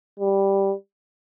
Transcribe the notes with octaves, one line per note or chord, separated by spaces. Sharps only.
G3